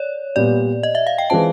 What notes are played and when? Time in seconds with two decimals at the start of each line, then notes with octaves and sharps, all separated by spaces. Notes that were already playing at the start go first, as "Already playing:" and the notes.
Already playing: C#5 D5
0.36 A#2 G3 B3 D5
0.83 D#5
0.95 E5
1.07 F5
1.18 G5
1.30 E3 G#3 C4 F4 A5